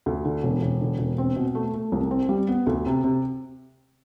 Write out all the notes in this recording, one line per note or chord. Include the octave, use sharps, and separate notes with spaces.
D2
D3
E1
E1
D3
E1
C4
B2
A3
A3
C2
C4
G3
B3
D2
C3
C3